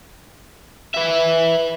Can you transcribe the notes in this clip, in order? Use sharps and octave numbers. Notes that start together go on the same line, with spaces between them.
B4 E5